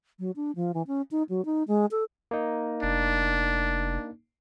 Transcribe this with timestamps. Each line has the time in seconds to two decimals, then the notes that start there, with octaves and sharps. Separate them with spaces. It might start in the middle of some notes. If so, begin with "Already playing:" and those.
0.19 F#3
0.36 D4
0.56 F3
0.74 E3
0.87 C#4
1.11 D#4
1.29 F#3
1.45 D#4
1.68 G#3
1.91 A4
2.31 A#3 D#4
2.83 F1 D4